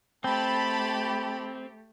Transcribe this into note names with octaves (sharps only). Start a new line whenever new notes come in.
A3 C4 G4 A5 B5